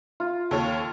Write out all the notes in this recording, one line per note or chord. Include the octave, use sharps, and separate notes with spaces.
F4
D#2 A4 C#5